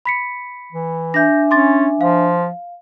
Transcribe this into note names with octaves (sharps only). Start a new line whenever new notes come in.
B5 B6 C#7
E3
D4 E5 G#5 G6 A#6
C#4 C6 D6 A6
F3 F5